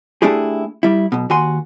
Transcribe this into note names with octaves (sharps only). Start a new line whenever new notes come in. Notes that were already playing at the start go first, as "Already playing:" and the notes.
A3 D4 E4 G4 G#4
G3 E4
B1 B2
D#2 F#4 G#5 C6